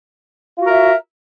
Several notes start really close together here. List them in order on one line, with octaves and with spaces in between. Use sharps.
F4 F#4 A#4 E5